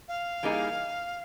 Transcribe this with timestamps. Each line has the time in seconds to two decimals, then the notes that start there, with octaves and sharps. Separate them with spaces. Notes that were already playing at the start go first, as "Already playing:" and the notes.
0.08 F5
0.43 E3 G3 A#3 D#4 G#4